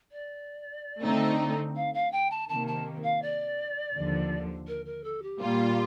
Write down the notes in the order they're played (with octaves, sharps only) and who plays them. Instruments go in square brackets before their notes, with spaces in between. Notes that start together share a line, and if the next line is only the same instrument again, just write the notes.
[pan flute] D5
[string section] D3 A3 C4 D#4
[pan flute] F5
F5
G5
A5
[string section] C3 D#3 A#3 [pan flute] A5
[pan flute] A5
F5
D5
[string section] D#2 D3 F3
[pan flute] A#4
A#4
A4
G4
[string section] A#2 G3 A#3 F4